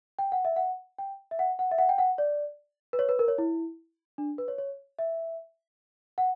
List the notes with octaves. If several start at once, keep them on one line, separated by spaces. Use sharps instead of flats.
G5
F#5
E5
F#5
G5
E5
F#5
F#5
E5
F#5
G5
F#5
D5
B4
C#5
B4
A#4
C#5
E4
D4
B4
C#5
C#5
E5
F#5